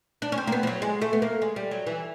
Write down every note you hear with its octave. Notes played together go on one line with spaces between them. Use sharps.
D4
C#4
C4
A#3
B3
F3
F#3
G#3
A3
B3
A#3
G#3
G3
F#3
E3